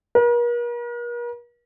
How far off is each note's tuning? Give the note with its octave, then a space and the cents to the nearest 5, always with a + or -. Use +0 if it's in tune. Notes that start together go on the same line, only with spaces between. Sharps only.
A#4 +45